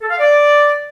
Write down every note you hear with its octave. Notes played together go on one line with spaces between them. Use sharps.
A4
F5
D5